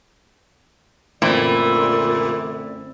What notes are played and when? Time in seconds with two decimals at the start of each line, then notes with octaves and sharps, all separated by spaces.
1.22 F#2 A#2 D3 E3 A3 C4 D5